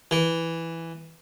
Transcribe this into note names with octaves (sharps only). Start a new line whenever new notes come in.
E3